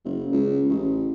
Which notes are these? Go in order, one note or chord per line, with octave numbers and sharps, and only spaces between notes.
F#1
C#2
A1